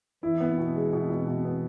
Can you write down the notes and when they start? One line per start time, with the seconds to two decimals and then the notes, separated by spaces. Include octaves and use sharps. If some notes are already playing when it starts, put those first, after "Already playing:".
0.23 E3 E4
0.41 B3
0.58 B2
0.76 G#3
0.93 B2
1.10 B2
1.28 B2
1.45 B3